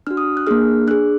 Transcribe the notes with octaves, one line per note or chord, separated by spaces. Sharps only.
D4 F#4 F6
D#6
F#6
A#3 D4 G#4 F6
D4 G#4 F#6